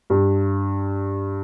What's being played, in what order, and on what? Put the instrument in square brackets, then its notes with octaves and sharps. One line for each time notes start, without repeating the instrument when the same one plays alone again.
[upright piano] G2